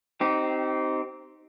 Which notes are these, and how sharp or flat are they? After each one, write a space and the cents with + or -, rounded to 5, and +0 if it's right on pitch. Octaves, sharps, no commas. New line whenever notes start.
C4 +0 D#4 +0 G4 -25